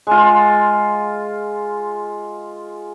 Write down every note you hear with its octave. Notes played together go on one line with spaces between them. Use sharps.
G#3 F4